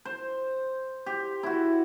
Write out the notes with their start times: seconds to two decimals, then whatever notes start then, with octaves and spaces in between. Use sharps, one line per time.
0.05 C5
1.06 G4
1.43 E4 F#4